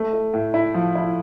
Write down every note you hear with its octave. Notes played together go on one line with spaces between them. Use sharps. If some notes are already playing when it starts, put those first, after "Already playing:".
Already playing: A3
A3
A2
E4
F3
E4